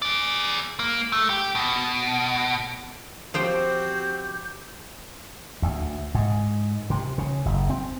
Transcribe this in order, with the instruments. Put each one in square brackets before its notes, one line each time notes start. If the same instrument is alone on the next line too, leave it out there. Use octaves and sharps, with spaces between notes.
[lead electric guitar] G#4 D5
A#3
A3
G4
B2
[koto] F3 C5 G5 [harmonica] C4 F#4 [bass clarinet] G4 [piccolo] G6
[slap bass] D2
G#2
C3
C#3
F#1
C4